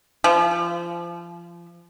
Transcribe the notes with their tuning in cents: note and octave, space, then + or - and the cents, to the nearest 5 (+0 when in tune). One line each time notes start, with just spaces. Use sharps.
F3 -25